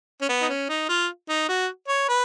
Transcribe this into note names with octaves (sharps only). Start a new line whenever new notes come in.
C#4
B3
D#4
C#4
D#4
F4
D#4
F#4
C#5
B4